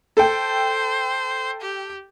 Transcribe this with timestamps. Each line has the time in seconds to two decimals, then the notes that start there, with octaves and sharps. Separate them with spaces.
0.17 A4 C5 G5
1.62 G4